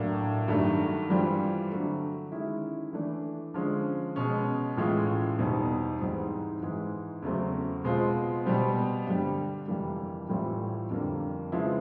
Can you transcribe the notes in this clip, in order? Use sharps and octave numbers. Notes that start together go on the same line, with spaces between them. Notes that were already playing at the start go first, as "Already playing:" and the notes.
Already playing: A2 F#3 A#3 D4
G2 D#3 F#3 A3
G2 E3 G3 C4 F4
D3 F#3 A3
D#3 G#3 C#4 E4
E3 A3 D4
D3 F3 G#3 C#4
B2 G#3 C#4
A2 E3 G#3 C#4 F4
E2 B2 G3 C4 D#4
G#2 E3 G3 C4 D#4
G#2 E3 G#3
E2 C#3 F#3 A3 C4
B2 G#3 C4 F4
B2 G3 C4
G2 D3 G3
F2 C3 E3 G3 A#3
A2 E3 G3 C4 F4
F2 D3 G3 A#3
C#3 F3 G#3 B3 E4